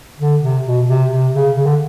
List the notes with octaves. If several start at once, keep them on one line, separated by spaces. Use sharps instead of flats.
D3
C3
B2
C3
C3
C#3
C#3
D3